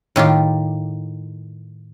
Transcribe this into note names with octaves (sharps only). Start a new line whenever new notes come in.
A2 D#3 F4 G4